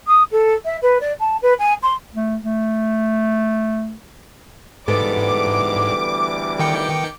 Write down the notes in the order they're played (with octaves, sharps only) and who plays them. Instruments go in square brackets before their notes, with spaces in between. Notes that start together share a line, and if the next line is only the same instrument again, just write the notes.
[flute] D#6
A4
E5
B4
D5
A5
B4
G#5
C6
[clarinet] A3
A3
[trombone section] D2 E3 G3 [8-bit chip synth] G#2 [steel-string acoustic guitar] B3 A4 [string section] D6
[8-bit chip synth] D#3 G5 C#7